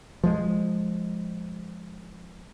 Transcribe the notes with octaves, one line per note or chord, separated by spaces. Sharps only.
F3 G#3